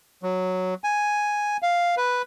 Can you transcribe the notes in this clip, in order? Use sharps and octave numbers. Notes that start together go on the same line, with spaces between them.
F#3
G#5
F5
B4